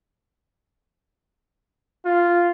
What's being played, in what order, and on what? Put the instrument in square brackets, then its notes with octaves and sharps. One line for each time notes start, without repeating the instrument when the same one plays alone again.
[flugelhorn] F4